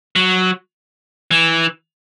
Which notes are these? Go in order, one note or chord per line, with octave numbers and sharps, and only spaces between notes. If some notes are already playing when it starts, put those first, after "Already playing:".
F#3
E3